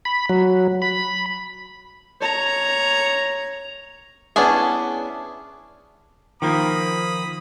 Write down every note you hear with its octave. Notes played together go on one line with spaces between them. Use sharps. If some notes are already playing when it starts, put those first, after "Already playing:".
B5
F#3
B5
C#5 A#5
B3 C#4 D4 E4 G#4
D#3 F3 A#3 B5 D#6